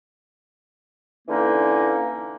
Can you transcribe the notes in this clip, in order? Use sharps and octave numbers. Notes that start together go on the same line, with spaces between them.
D3 E3 A#3 C#4 D#4